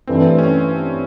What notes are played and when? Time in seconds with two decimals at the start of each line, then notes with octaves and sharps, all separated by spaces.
0.07 G2 E3 A3 C4 D4
0.38 C#4